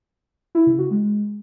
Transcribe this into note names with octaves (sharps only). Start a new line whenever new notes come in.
E4
C#3
F#4
G#3